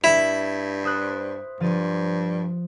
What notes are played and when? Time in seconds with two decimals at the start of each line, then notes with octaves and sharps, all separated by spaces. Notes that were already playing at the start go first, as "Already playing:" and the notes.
0.04 G2 E4
0.84 C5 D#6 F#6
1.60 G2 F3 A6 D#7